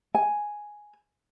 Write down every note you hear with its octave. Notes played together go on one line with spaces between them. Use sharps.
G#5